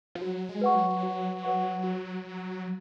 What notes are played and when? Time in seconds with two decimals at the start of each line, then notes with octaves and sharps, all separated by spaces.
0.15 F3
0.21 F#3 F#4
0.49 G#3
0.61 B4 F#5 C#6
0.75 F#3
1.03 F#4
1.43 B4 F#5 C#6
1.84 F#4